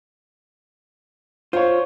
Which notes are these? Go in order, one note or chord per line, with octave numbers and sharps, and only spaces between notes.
F4 C5 C#5